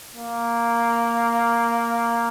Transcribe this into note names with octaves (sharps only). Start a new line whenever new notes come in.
A#3